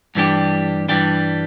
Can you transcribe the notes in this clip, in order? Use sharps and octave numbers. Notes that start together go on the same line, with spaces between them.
G2 E3 G3 D4 G4
G2 E3 G3 D4 G4